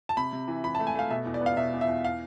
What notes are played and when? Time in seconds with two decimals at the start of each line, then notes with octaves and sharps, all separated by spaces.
0.09 A5
0.17 C3 B5
0.33 C3
0.48 E3
0.64 E3 B5
0.75 A5
0.79 A3
0.87 G#5
0.95 A3 F5
1.10 B2 E5
1.26 E2
1.34 D5
1.41 B3
1.46 F5
1.57 B2 E5
1.73 E2
1.81 E5
1.88 E2
2.05 F5